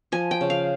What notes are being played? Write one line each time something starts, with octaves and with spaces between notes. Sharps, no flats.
F3 G#5
G5
C#3
F5